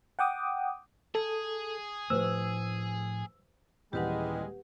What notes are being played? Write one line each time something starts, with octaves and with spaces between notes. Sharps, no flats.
F#5 G5 D6 D#6
G#4 A4
A2 F3 A3 G4 B4 C5 E6
D#1 E3 G3 G#3 G4 B4 F#5